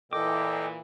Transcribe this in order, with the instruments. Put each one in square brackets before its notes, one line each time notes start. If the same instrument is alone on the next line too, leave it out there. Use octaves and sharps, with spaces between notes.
[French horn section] A#2 E3 [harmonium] A4 D#5 G5 [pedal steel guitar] D6